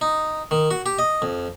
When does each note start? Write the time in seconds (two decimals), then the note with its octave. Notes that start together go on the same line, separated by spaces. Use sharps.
0.01 D#4
0.51 D#3
0.71 F#4
0.86 G4
0.99 D#5
1.22 F2